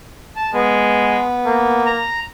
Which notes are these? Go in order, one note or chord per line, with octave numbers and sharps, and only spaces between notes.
A5
G#3 B3
A#3
A#5